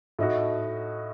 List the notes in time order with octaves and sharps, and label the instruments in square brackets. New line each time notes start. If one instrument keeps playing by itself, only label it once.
[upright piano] A2 A3 D#4 F#4